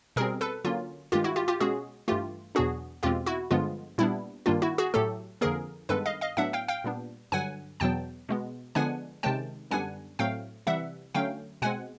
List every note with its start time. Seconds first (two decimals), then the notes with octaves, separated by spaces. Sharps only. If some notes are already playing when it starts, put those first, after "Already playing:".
0.16 B2 G3 C4 G#4 A#4
0.41 A4 B4
0.64 D3 F#3 A#3 C#4 F4
1.12 G2 D#3 G#3 F4 G4
1.24 E4 F#4
1.36 F4 G4
1.48 F4 G4
1.60 B2 G#3 C#4 F#4 G#4
2.08 G2 E3 A3 F4 G4
2.55 E2 B2 F#3 B3 D4 F#4 G#4
3.03 E2 B2 G#3 C4 F4 G4
3.26 E4 F#4
3.51 G2 D3 F3 G#3 B3 F4
3.98 A#2 G3 B3 D4 E4
4.46 G2 D#3 G3 A#3 D4 F4
4.62 E4 F#4
4.78 F#4 G#4
4.94 A2 F#3 A3 G4 A4
5.41 F2 D3 F3 A#3 G#4 A#4
5.89 G2 D#3 G#3 B3 A4 B4
6.06 D#5 F5
6.21 D#5 F5
6.37 A2 F#3 B3 D4 E5 F#5
6.53 F5 G5
6.68 F5 G5
6.84 A#2 G3 B3 D4
7.32 G2 D3 F#3 F#5 G#5
7.80 E2 B2 F#3 B3 G5 A5
8.29 B2 G#3 B3
8.75 D3 F3 G#3 B3 D4 F#5 G#5
9.23 C3 D#3 G#3 C#4 G5 A5
9.71 F#2 D3 G3 B3 D4 F#5 G#5
10.19 A2 F#3 A3 C4 F5 G5
10.67 C3 E3 G3 E5 F#5
11.15 D3 F#3 A3 C#4 F5 G5
11.62 B2 G#3 C4 F#5 G#5